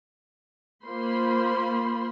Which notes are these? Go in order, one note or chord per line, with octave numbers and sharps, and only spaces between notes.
A#3 F4 C5 B5 C6